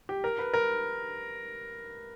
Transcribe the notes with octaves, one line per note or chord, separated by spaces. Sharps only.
G4
A#4
B4
A#4